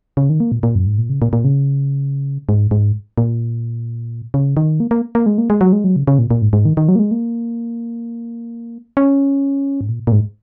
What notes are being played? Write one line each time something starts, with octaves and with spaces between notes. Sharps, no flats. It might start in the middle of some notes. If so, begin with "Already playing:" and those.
C#3
D#3
A#3
A#2
A#2
F#2
G#2
A#2
C#3
A#2
A#2
C#3
G#2
G#2
A#2
C#3
D#3
A#3
A#3
A#3
G#3
A#3
G#3
F#3
G#3
F#3
C#3
C#3
A#2
A#2
G#2
G#2
D#3
D#3
F#3
A#3
G#3
A#3
C#4
G#2
A#2
A#2
G#2